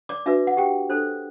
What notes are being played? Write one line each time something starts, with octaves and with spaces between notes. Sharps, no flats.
D5 D6
D4 F#4 B4 E5
F#5
G4 G5
D4 A4 C5